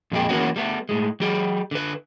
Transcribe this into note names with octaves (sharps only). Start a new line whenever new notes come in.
F2 A#2 G3 G#3 G4
E3 F#3 A#3 B3 C#4 F#4
G3 A3 B3
A2 G#3
F#3 G4 G#4
D3 B4